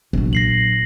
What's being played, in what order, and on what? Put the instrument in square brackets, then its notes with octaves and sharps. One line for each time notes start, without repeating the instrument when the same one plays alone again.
[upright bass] A#1 F#3
[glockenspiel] A#6 C7 F#7